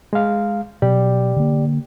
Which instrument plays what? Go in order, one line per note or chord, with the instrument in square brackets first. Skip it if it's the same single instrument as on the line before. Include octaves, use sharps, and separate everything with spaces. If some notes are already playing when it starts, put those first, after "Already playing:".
[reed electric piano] G#3 F5
[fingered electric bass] B2 F#3 [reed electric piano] G4 D5 G5
[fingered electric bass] D3 A#3